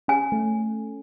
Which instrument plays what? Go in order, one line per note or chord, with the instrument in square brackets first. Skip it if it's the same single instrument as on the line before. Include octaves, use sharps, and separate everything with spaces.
[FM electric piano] C#4 [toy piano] G#5
[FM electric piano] A3